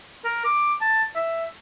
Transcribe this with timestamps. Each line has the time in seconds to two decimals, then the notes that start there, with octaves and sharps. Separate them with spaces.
0.25 A#4
0.45 D6
0.81 A5
1.16 E5